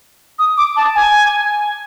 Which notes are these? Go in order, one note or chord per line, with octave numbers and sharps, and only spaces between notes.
D#6
D6
A5
G#5